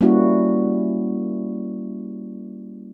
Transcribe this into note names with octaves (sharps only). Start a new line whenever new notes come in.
G3 A#3 C#4 E4 F#4